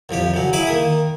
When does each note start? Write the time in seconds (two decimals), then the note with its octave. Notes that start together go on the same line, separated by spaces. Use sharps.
0.09 C2 F2 F3 G4
0.34 C#3 F#3
0.53 E4 G#4 E5 G#5 B5 D6
0.67 D#3 A#3 D#6